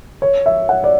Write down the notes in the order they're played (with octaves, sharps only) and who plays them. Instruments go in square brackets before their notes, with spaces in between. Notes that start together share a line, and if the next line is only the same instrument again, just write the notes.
[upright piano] C#5
E5
F#5
D5